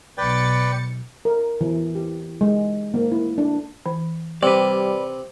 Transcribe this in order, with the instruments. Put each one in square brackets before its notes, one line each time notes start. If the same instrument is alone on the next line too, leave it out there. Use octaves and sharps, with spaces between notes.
[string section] B1 A6 C#7 [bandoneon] B4 D5 G5
[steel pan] A#4
E3
G4
G#3
A#3
E4
D4
[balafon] E3
[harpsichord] C3 [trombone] G3 [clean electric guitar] B4 D5